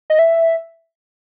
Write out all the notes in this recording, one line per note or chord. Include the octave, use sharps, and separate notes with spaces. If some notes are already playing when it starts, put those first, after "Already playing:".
D#5
E5